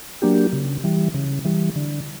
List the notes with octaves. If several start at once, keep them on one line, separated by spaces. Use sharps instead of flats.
F#3 A#3 D4 G4
C#3
E3 G3
C#3
E3 G3
D3